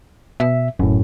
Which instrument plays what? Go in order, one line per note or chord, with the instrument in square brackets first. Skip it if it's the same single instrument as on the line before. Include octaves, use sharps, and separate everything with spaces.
[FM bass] B2 [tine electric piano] E5
[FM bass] D#1 [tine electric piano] F#2 A2